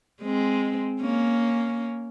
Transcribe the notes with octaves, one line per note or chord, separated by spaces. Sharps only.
G#3 C4
A#3 C#4